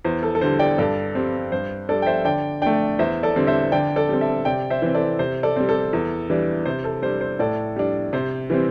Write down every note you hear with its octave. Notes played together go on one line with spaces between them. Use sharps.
E2 C5
A4
A4
D3 G3 C5
D5 G5
G2 A4 D5
G3 C4
G2 C5
G3 D4 A4 D5
G5
C5 E5
D3 D5 G5
A3 D4 D5 G5
E2 C5 E5
A4 D5
D3 G3 C4
C5 E5
D3 D5 G5
A4 D5
G3 C4
E5 A5
C3 D5 G5
C5 E5
E3 C4
A4 D5
C3 C5
A4 D5
G3 C4
A4
E2
E3 G3 D4
C3 C5
A4
G3 D4 C5
C5
A2 A4 D5
G3 D4
C3 C5
E3 G3 C4